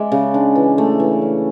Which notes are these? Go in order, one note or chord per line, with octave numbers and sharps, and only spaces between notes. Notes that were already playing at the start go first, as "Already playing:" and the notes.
Already playing: G#3 D5 E5
C#3
D4
E3
A3
E3
C#4